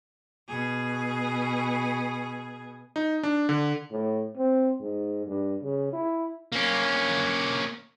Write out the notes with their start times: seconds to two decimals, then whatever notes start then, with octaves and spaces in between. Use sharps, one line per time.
0.48 B2 G#4
2.96 D#4
3.23 D4
3.49 D3
3.91 A2
4.37 C4
4.80 G#2
5.27 G2
5.62 C#3
5.93 E4
6.52 A#3 C#4